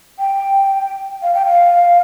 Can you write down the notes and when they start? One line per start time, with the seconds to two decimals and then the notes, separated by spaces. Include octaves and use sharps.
0.19 G5
1.23 F5
1.34 G5
1.46 F5